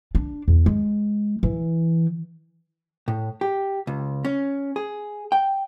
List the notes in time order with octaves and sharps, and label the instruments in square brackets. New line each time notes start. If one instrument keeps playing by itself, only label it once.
[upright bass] D4
E2
G#3
E3
[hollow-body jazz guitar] A2
G4
C#2
C#4
G#4
G5